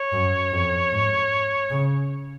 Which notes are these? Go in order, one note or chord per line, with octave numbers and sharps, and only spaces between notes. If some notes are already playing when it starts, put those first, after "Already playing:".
Already playing: C#5
F#2
F2
G#2
C#3